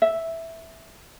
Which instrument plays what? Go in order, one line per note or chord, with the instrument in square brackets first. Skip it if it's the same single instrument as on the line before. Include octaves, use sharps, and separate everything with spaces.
[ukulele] E5